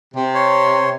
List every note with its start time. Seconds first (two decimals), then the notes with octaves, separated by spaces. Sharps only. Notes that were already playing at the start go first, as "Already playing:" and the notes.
0.14 C3
0.35 C#5 C6